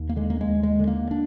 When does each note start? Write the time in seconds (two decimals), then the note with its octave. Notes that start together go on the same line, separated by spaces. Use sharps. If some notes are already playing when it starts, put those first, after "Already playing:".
Already playing: D#2
0.09 A#3
0.16 D3 G#3
0.30 A#3
0.41 G#3
0.48 D#2
0.63 G#3
0.79 D3
0.87 A#3
1.11 D4